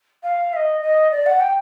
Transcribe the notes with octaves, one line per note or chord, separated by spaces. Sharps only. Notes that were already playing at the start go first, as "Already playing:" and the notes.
F5
E5
D#5
D#5
D5
F#5
G5